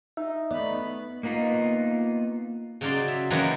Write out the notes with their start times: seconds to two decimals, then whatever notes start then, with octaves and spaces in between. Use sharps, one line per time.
0.17 D#4 E5
0.51 A3 B3 D5 B5
1.23 A#3 B3 D#4 F4
2.81 C#3 F#3 D#4 D5 C6
3.08 E5
3.30 F#2 D#3 E3 F#3 A#3 B4